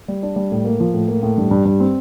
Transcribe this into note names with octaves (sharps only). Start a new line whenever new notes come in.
G3
D4
G3
A2
A#3
F3
A2
A#3
A2
G2
G2
G2
C4